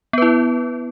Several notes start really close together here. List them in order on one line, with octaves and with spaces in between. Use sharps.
B3 B4 E4